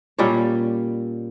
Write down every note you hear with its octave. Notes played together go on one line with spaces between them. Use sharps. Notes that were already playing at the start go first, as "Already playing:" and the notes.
A#2 G3 C#4 C#5